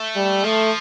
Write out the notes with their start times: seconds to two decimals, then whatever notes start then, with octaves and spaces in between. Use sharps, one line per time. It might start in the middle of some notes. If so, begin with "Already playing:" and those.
Already playing: A3
0.16 G3
0.45 F3 A3